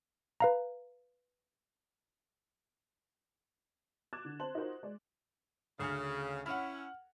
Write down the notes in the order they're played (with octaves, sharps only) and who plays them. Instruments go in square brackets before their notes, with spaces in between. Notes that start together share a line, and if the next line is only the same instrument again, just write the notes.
[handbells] B4 F5 A#5
[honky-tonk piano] D6 F#6 G#6 A6 E7
D3
C4 C5 A5 C6 F#7
D#4 F4 F#4 A#4 C5
G#3 D5
[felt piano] D2 F6 [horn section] C#3
[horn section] C#4 E4 [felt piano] F#5 F6